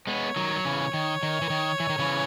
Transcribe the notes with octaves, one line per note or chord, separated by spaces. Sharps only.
G#3 B3 C#5
D#3 F#3
F#3
C#3 E3
D#3
D#3
E3
D#3
E3
D#3
C#3 E3